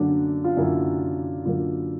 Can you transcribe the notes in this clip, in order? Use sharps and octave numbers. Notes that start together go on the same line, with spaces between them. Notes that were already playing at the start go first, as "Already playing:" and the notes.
Already playing: F#2 D3 F#3 A#3 D4
F4
F#2 D3 F#3 A#3 E4
F#2 D3 F#3 A#3 F4